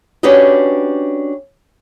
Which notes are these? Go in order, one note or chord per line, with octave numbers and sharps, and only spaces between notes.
C#4 D4 F#4 G4 B4 D#5